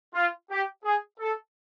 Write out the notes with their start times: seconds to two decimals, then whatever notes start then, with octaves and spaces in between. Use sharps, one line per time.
0.14 F4
0.51 G4
0.84 G#4
1.20 A4